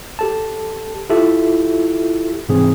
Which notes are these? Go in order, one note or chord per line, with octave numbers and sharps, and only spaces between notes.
G4 A4 A5
E4 F4 G4 A4 E5
G#2 C3 E3 C4 G#4